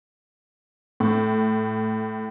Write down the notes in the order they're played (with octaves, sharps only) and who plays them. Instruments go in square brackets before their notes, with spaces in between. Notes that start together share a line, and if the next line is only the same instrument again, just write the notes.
[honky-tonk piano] A2